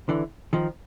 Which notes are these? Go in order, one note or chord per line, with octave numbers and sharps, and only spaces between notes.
D3 E3
D#3 F3